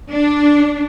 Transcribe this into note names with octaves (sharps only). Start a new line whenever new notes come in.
D4